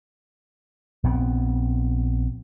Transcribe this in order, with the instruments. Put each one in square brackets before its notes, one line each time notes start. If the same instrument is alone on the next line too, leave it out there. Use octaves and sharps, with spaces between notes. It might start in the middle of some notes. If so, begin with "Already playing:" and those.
[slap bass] A#1 B3 C4